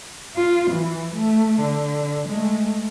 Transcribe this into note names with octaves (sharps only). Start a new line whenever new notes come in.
F4
E3
A3
D3
G#3 A3